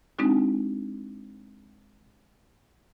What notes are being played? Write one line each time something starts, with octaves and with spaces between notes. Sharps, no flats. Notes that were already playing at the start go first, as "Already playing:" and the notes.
G#3 C4 D4 D#4 F#4